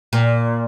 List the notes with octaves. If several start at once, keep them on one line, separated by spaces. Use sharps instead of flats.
A#2